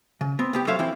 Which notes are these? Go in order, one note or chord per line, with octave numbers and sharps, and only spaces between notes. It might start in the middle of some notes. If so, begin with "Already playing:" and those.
C#3
B3 C4
C2 B3 G4
F#3 A4 C5 C#5 E5 F5
E3 C4 E4 F4